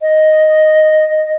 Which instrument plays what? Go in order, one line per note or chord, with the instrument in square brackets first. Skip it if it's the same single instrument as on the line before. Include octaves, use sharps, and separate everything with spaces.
[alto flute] D#5